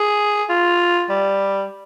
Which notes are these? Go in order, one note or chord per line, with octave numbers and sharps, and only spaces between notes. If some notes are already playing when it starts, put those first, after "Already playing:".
Already playing: G#4
F4
G3